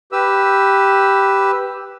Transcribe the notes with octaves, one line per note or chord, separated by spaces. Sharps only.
G4 B4 E6